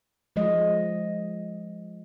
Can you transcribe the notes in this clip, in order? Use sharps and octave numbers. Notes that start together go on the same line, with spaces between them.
F3 G#3 D#5